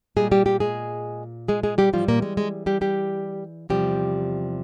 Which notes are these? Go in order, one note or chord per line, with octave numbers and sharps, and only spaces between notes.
A#2 G3 G#3 G#4
G3 G4
G3 G4
G#3 G#4
G#3 G#4
G#3 G#4
G3 G4
G#2 E3 F3 G3 F4
A#2 A#3
G#3
G#3
G3 G4
G3 G4
E2 C3 F3 G3 G4